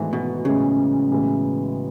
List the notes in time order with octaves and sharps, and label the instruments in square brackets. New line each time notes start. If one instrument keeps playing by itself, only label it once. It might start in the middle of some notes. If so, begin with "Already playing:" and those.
Already playing: [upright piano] G#1 G#2 E3 A3
[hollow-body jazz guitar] B2
[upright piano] B1 A2 E3 G#3 [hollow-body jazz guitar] C#3
[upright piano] B1 A2 E3 G#3